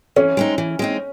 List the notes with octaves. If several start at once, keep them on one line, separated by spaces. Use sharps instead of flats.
E3 C#4
G#3 C4 D#4
E3
G#3 C4 D#4